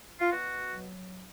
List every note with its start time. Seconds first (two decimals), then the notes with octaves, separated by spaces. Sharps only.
0.20 F4
0.30 B2 F#4
0.69 F#3